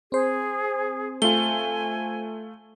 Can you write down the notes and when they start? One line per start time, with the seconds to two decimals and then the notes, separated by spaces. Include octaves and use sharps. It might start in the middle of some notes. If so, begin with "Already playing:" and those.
0.12 C4 G#4 C5
1.22 A3 F4 G#5 G7